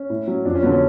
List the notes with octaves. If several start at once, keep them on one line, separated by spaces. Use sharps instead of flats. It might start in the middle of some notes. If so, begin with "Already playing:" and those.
Already playing: C#4
A2
F#3 C#4
F2 D4
C#4
D3 F#3 B3
C#4